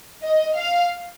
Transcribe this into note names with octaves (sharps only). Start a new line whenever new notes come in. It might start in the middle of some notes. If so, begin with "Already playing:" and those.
D#5
F5